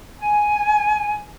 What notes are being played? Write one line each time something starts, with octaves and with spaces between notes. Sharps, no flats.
G#5